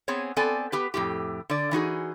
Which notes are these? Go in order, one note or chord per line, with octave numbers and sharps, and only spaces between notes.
B3 C4 G#4 C#5
B3 C4 A4 D5 G#5
B3 G4 B4
F2 A2 G4
D3 D5
E3 D#4 F#4 G#4